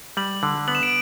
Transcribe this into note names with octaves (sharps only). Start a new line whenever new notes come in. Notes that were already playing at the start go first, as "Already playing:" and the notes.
G3 F#7
D3
B3 F#7
E7
D7